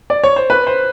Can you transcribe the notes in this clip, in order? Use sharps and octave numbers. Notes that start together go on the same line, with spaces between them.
D5
C#5
C5
B4
C5